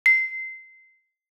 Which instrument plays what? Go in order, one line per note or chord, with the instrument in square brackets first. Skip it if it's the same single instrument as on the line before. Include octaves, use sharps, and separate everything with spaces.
[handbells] C7